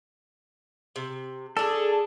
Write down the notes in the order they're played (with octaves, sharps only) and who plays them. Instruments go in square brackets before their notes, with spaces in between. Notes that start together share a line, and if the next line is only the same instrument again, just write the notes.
[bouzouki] C3
[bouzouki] D4 G#4 [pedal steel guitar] A4